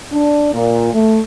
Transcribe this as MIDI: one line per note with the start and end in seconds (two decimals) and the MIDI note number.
0.12 0.49 62
0.54 0.91 46
0.93 1.19 57